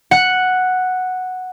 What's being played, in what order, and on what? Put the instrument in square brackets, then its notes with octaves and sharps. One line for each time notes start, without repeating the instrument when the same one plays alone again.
[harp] F#5